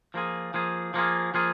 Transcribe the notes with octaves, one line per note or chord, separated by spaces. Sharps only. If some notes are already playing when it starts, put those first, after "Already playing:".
F3 A#3 F4 G#4
F3 A#3 F4 G#4
F3 A#3 F4 G#4
F3 A#3 F4 G#4